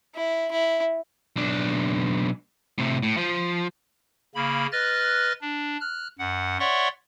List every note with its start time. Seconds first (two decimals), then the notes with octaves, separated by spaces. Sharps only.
0.15 E4
0.51 E4
1.36 B1 D4
2.78 A2 C3
3.03 A2
3.17 F3
4.35 C#3 A#3 B5
4.72 B4 D#5 F6 F#6 A6
5.42 D4
5.81 F6 F#6
6.19 F#2 F#5
6.60 C#5 D5 E5 F#5 C6 C#6